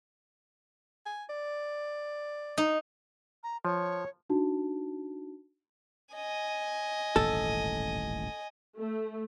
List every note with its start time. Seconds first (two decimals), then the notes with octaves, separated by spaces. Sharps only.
1.06 G#5
1.30 D5
2.58 D#4
3.43 A#5
3.65 F3 C#5
4.30 D4 D#4 F#4 A5
6.14 D#5 G#5
7.16 D#1 A1 G#2 A4
8.77 A3